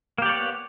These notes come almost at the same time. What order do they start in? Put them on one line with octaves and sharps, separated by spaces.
A#3 G4 D5 C#5 B3